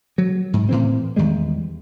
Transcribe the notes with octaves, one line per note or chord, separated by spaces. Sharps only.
F#3
G#2
A2 E3 C4
E2 D#3 G3 G#3